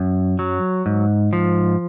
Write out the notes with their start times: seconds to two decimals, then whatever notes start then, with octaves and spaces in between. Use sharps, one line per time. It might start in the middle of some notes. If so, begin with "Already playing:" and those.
Already playing: F#2
0.39 F#3
0.86 G#2
1.33 F3